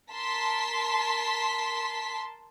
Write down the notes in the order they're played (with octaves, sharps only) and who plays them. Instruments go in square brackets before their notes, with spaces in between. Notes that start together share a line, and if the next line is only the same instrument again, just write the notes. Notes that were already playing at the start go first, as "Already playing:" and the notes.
[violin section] A#4 A5 C6 B6